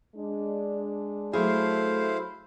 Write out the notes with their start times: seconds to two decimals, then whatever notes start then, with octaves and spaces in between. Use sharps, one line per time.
0.15 G#3 D4
1.33 F#3 A3 E4 G#4 C5 F5